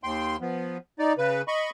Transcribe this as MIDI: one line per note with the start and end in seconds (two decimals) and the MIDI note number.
0.04 0.37 39
0.04 0.37 79
0.04 0.37 84
0.41 0.78 53
0.41 0.78 59
0.99 1.13 63
0.99 1.13 74
1.18 1.42 49
1.18 1.42 71
1.48 1.70 75
1.48 1.70 83
1.48 1.70 85